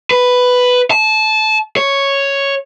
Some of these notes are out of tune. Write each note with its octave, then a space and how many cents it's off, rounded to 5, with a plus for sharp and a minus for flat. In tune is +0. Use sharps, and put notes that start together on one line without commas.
B4 +5
A5 -20
C#5 +0